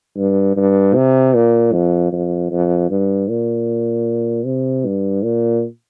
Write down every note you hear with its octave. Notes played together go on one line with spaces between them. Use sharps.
G2
G2
C3
A#2
F2
F2
F2
G2
A#2
C3
G2
A#2